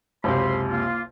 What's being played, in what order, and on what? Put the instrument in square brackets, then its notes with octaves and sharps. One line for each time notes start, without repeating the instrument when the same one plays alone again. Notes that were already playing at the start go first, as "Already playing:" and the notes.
[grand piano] F#1 C#2 C3 [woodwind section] C5 B5 C6
[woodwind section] A#3 F4